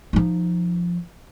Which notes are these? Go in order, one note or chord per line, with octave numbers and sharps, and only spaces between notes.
F3 D#4